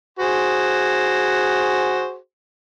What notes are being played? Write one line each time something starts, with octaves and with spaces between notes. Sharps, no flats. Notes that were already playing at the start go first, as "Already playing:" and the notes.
F#4 G#4 C5